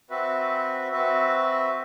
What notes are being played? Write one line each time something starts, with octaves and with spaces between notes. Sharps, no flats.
C4 F#4 B4 E5
C4 F#4 B4 E5